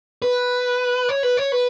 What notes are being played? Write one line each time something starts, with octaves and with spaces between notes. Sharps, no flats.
B4
C#5
B4
C#5
B4